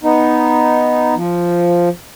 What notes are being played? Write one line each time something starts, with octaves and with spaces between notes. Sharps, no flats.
B3 D#4
F3